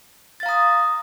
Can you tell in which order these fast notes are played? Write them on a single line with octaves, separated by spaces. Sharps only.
A6 F5 A#5 D#6